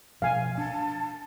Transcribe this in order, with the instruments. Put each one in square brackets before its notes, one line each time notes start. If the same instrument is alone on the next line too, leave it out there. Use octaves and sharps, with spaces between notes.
[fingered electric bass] B2 F3 [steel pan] F5 G#5
[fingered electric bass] D4 [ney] A5